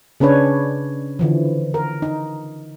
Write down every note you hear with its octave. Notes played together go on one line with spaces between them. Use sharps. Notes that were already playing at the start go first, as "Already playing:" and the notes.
C#3 C#4 D4 B4 C#5
D3 E3 F3
A#4
D#4